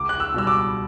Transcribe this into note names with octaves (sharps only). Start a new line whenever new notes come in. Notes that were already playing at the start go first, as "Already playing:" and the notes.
Already playing: C#2 D6
F#6
E6
B2 G3 E6
D6